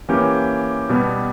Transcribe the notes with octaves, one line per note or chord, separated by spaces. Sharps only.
E3 A#3 C#4 G4
B2 G3 B3